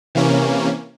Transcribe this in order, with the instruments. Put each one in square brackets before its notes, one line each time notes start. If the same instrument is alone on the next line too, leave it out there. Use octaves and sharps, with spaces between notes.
[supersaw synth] C3 E3 A#3 C#4